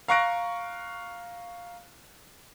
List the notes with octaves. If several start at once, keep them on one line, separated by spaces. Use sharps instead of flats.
F5 A#5 C#6 F#6 A#6 D7